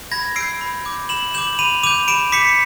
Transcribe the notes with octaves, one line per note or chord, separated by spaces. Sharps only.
B5 G#6 A#6
E6 G6 C7 D7
B5
D6 G6
B5 E7 F#7
D6 G6 E7 F#7
B5 D#7 F7
D6 G6 D#7 F7
B5 D7 E7
D6 G6 B6 C#7